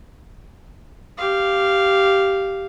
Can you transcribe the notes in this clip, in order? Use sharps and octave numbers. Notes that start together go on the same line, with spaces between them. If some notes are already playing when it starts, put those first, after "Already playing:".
G4 F5